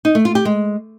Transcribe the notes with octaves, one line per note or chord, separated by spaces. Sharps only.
D#4
A3
F4
G4
G#3